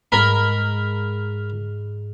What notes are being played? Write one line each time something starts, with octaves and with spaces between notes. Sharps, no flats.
G#2 A#4 B5